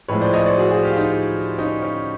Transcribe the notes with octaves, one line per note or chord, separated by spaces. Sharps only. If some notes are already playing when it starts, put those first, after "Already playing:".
A2 F3 G#3 B4 C#5
C5 D5
C#5 D#5
C5 D5
F#4 G#4
F#4 G#4
F4 G4
D#4 F4
C#4 D#4
C#4